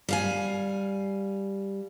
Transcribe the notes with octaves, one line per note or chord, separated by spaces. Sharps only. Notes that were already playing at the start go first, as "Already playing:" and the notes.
G3 F5 G#5